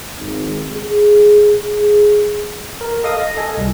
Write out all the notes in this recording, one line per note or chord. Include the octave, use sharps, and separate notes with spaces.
G#1
G#4
A#4
A4 D#5 F5 D#6
A#6
A4 D#5 G#5
C2 G3